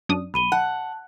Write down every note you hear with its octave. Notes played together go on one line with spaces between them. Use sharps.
F#2 D4 D#6
B1 B5 D#7 G7
F#5 A5